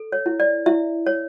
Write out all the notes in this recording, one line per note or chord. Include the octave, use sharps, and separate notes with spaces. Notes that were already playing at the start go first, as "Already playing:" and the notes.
Already playing: A4
C#5
E4
D5
E4 E5
C#5